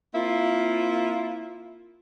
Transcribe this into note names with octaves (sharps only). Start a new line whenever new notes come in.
A#3 C4 E4 F4